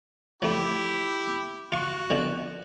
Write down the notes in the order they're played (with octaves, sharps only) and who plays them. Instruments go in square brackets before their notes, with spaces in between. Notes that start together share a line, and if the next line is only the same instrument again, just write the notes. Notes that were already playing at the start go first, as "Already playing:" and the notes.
[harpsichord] F3 A3 [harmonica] E4 G4
[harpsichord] F4 C#6 [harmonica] F#4
[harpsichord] B2 D3 F3